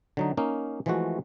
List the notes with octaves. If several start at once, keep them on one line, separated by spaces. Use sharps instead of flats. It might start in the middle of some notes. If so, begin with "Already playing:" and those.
D3 F#3 D#4
A#3 C#4 D#4
E3 F3 G#3 A3 F#4